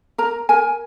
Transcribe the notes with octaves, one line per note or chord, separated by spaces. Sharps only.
A#4 A#5
A#4 G#5